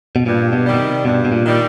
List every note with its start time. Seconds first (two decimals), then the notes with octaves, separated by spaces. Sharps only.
0.16 B2
0.26 G2 A#2
0.53 B2
0.66 D#3 G3
0.74 B2
0.80 C3
1.05 G2 B2
1.25 B2
1.32 A#2
1.45 D#3 G3